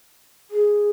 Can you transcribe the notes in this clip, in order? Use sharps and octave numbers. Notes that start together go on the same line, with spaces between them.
G#4